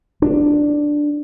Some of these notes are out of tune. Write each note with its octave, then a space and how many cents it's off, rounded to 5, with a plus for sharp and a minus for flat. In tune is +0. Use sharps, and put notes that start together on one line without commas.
D4 +5